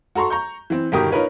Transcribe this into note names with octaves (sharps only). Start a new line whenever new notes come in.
F#4 A4 A#5 C6 C#6
A#5 C#6 G6
E3 C4
G1 B2 D#3 G4 A#4 D#6
C#4 D#4 F4 A#4 B4 C#5